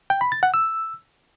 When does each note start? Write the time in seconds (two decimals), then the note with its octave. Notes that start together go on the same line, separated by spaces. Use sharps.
0.10 G5
0.21 B5
0.32 A6
0.43 F#5
0.54 E6